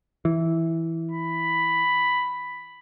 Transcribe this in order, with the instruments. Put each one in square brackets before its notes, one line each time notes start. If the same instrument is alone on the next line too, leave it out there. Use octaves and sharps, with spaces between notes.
[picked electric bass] E3
[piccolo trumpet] B5